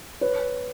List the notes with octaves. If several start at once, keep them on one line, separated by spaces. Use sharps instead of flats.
B4 C#5